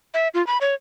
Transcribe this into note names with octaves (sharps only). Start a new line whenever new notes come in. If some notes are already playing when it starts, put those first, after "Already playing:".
E5
F4
B5
C#5